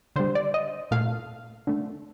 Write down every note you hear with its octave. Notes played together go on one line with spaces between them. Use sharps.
D3 G3 C5
D5
D#5
A#2 A3 F5
D3 A3